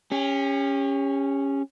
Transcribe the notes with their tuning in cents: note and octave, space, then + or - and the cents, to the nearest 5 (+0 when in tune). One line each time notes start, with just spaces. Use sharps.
C#4 +0 G4 +40